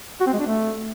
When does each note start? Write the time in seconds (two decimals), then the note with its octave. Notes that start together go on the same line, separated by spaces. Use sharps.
0.20 F#4
0.27 C4
0.33 G#3
0.40 D4
0.46 A3